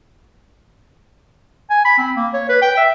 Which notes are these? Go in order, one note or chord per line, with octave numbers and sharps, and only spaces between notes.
G#5
B5
C4
A#3
C#5
B4
G5
E5